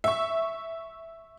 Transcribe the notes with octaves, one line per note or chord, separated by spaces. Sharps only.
E5 C#6